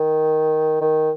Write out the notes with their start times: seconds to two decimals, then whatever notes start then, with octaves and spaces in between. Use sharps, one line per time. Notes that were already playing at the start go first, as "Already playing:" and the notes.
Already playing: D#3
0.81 D#3